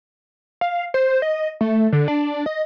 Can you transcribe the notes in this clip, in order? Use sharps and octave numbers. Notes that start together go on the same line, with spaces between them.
F5
C5
D#5
A3
D3
D4
D#5